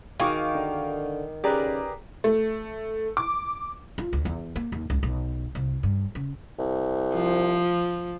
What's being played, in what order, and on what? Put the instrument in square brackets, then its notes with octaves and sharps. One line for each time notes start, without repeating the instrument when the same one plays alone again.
[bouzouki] D#3 [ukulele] F#4 G#4 [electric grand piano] F5 C#6 D6
[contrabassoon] D3
[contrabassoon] C#3 [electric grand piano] G4 G#4 A#5 [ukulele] A#4 B4 D5
[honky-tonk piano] A3
D6
[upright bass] F4
D2
E2
A#3
D#2
C#2
B1
C2
G2
C#3
[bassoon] C2
[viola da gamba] F3